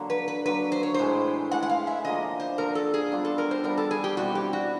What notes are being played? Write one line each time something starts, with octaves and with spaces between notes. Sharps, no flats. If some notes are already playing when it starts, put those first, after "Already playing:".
Already playing: D3 F#3 A#3
B4
B4
D3 F#3 A#3 B4
C5
C#5
A2 E3 G#3 C5
A2 E3 G#3 F#5
F#5
F5
E5
D3 F3 A#3 D#5
C5
D3 F3 A#3 A#4
A4
G#4
G3 B3 D4 F4
A4
A#4
C5
G3 B3 D4 F4 A#4
A4
G#4
G4
B2 G3 C4 E4 F#4
G4
F#4